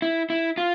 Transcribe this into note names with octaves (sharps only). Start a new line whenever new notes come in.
E4
E4
F4